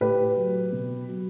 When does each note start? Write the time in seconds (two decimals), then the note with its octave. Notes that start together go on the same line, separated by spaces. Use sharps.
0.01 A2 G4 B4
0.36 F#3
0.72 B2
1.09 F#3